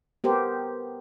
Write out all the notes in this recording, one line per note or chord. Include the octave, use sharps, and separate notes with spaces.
B3 G4 A#4 C5